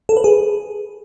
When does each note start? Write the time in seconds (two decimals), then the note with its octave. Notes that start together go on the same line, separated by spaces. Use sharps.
0.09 A4
0.17 B4
0.24 G#4